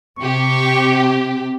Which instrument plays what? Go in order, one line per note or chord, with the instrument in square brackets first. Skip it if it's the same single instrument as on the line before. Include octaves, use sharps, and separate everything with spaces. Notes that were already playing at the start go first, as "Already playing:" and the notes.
[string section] C3 G4 [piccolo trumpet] C#6